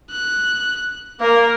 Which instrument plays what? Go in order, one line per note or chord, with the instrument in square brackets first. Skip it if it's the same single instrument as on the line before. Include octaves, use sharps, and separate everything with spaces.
[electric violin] F#6
[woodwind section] A#3 [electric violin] A#4